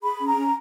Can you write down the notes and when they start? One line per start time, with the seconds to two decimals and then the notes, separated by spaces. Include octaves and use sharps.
0.02 G#4 B5
0.20 C#4
0.27 A#5
0.36 C#4